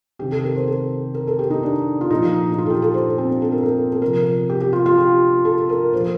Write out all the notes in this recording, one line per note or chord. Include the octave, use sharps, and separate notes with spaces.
C3 D#3 G4
A4
A#4
C5
A4
A#4
A4
G4
D#4
D4
F4
A#2 F3 D#4
D#4
F4
A4
G4
A4
C5
C4
D4
A4
A#4
A4
A4
C3 F3 A#4
G4
G4
F4
F4
G4
A4
A#4
A#2 F3 C5
A#4